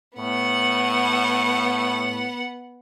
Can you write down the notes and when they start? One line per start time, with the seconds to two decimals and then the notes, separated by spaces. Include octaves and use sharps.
0.18 A2 B3 F#5